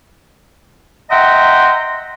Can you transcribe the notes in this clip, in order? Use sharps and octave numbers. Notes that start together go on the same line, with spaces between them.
D#5 E5 F#5 G5 A#5 C6